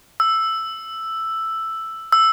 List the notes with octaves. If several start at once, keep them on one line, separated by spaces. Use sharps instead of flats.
E6
E6